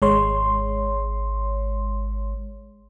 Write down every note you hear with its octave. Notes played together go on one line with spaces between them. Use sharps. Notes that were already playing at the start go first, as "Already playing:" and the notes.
G#1 G#3 C#5 C6